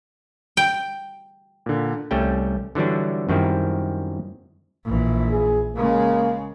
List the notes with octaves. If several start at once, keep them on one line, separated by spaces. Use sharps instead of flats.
G5
A#2 D3
C2 G3 A3 C#4 G5
D3 E3 F#3 G3 D4
F#2 D#3 G3 C4 E4
A#1 E3
G#4
C#3 G#3 A#3